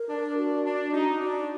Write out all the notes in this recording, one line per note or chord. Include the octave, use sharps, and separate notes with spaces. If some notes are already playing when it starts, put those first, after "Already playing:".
Already playing: A#4
D4
F#4
D4
D#4 F#4
D4